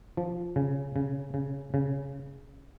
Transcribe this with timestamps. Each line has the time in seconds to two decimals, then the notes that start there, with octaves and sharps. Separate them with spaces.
0.17 F3
0.56 C#3
0.96 C#3
1.34 C#3
1.74 C#3